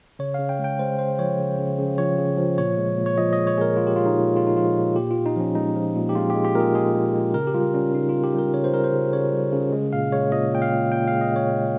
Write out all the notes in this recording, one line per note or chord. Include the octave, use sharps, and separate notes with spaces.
C#3 C#5
C#3 F5
G5
G#3
G5
G#3 C5
C#3 C5
F3 C#5
C#3
C#3
C#3
F3 C#5
C#3
F3
A#2 C#5
G#3
A#2
C#5
F3 D#5
D#5
G#3
C#5
A#2 G#4 A#4
G#3 F4
G4
G#3 F4
D#4
A#2
G#3 F4
D#4
F3 F4
A#2
A#2 G4
F4
A#2
D#4
F3 C#4
G#3 D#4
F3
A#2
G4
G#3 F4
G#3 G4
G4
A#2 A#4
G#4
G#3 G#4
G#3
G#3
C#3 A#4
G4
G3 F4
G3 C#4
C#3 D#4
G3 F4
G4
G3 A#4
C#3 C#5
C5
G3 A#4
C5
C#3
C#3 C#5
G3
C#3
G#3
A#2 F5
G#3 C#5
A#2 D#5
A#2 G5
F5
A#2
A#2 G5
G#3 F5
D#5
G#3 C#5
G#3